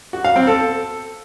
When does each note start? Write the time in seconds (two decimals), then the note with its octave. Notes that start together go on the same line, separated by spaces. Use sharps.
0.13 F#4
0.25 F5
0.36 C4
0.47 A4